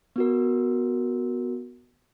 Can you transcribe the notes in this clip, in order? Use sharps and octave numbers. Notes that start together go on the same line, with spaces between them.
B3 F#4 A#4